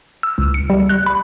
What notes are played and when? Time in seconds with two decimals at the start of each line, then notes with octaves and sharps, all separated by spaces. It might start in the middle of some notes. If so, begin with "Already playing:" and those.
0.23 E6
0.38 C#2
0.54 C#7
0.70 G3
0.89 F#6
1.06 B5